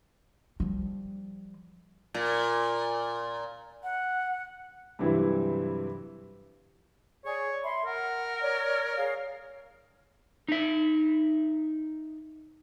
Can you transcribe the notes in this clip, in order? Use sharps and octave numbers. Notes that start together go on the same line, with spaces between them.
F3 G3
A#2
F#5
G2 C3 E3 F#3 G3 E4
G#4 C#5 D5
E5 B5 C6
A#4 F#5
C#5 D5
G#4 C#5 F5
D#4 E5